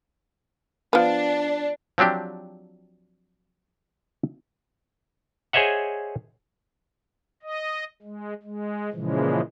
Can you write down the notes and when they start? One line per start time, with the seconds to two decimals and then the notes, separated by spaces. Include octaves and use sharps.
0.93 F3 B3 D4
1.98 F3 F#3 C4 D4 G4
5.53 G#4 C5 C#5 D#5 E5 F#5
7.43 D#5
8.02 G#3
8.43 G#3
8.93 A#2 C#3 E3 F3 G#3